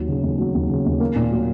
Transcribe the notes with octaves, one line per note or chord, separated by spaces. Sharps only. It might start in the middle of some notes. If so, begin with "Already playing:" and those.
Already playing: D#2 F#3
C#3
D#2
F#3
D#2
C#3
D#2
A#3
A#2
F#3